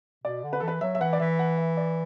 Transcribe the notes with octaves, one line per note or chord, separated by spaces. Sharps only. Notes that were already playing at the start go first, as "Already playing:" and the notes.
B2 D5
D3
B4
E3 A4
B4
F#3 E5
E5
E3 F#5
D5
E3 E5
F#5
E5
D5